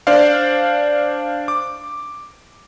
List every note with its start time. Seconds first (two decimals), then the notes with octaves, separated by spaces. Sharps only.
0.07 D4 C5 D5 F5
1.48 D6